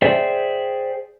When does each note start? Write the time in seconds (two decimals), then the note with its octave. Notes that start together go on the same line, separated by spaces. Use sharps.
0.02 G#4 C5 D5 E5 G5